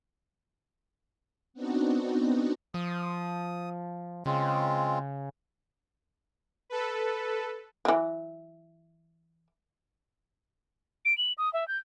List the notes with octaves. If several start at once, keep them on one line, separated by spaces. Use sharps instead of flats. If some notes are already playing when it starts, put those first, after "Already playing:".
B3 C4 D4 D#4 F#4
F3 D#6
C#3 G#3 C4 F4
A4 B4
E3 F#3
D7
F#7
D#6
E5
G6